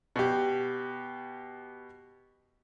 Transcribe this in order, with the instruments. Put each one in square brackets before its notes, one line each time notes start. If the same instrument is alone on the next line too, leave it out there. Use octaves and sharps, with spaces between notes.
[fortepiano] B2 G4